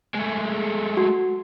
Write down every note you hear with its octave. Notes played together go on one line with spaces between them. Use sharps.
G#3 A3
F#4